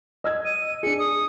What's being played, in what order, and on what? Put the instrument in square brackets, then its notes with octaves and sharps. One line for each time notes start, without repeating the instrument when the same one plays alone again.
[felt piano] D#5 E6 G#6
[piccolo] D#7
[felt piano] D4 G#4 [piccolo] C#7
[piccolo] D#6